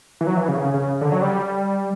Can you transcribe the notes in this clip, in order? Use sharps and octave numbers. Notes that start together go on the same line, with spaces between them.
E3
F#3
E3
C#3
C#3
C#3
D3
F#3
G3